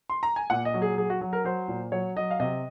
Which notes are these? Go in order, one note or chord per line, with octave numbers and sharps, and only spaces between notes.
C6
A#5
G#5
A#2 F#5
D#5
F#3
G#4
F#3 G#4
F#4
F#3
A#4
F#3 C5
A#2
F#3 C#5
F#3 D#5
F5
C3 D#5